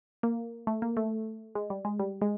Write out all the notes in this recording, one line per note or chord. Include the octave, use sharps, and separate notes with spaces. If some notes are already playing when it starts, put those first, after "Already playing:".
A#3
A3
A#3
A3
G#3
G3
G#3
G3
G#3